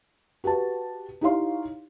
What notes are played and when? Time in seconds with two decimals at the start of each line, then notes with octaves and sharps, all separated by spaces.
0.44 F#4 G4 B4 A5
1.21 D#4 E4 G4 C#5 F5 C6